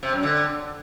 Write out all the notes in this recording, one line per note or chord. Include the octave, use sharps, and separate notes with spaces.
C3
F#2
D3